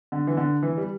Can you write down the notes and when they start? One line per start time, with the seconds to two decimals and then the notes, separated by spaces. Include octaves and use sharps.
0.12 D3
0.27 E3
0.37 D3
0.63 E3
0.77 G3